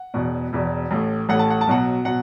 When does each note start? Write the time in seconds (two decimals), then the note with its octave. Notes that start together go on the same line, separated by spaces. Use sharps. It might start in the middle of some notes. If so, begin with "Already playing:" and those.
Already playing: F#5
0.14 E1 E2 B2
0.53 E1 E2 B2
0.91 A1 A2 A3
1.29 A1 A2 A3 F#5
1.39 A5
1.50 F#5
1.61 A5
1.67 B1 B2 F#3 F#5
2.05 B2 F#3 F#5